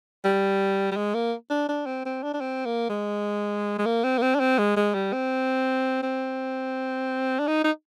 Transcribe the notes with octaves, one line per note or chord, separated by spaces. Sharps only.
G3
G3
G#3
A#3
D4
D4
C4
C4
D4
D4
C4
A#3
G#3
G#3
A#3
C4
A#3
C4
D4
C4
G#3
G#3
G3
C4
C4
D4
D#4
D#4